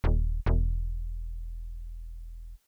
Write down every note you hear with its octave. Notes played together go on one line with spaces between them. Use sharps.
D#1
E1